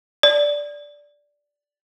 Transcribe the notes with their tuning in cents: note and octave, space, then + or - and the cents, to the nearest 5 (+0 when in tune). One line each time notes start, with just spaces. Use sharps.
D5 -5